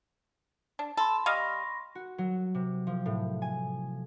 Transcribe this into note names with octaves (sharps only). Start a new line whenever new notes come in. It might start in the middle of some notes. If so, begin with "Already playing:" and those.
D4
A4 B5 C6
G3 D#5 F5 C#6 A#6
F#4
F#3
C3
F3
A2
G#5